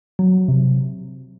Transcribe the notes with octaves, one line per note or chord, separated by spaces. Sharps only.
F#3
C3